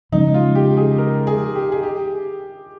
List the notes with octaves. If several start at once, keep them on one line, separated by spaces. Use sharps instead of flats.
C#3 F3 G#3 C#4 D#4
F4
G4
G#4
A#4
G#4
G4
G#4
G4